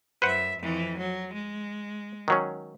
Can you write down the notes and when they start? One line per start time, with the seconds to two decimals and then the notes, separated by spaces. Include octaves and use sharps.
0.22 F#2 B4 C5 E5 F#5
0.58 F2 E3
0.98 F#3
1.33 G#3
2.28 D#3 F#3 C#4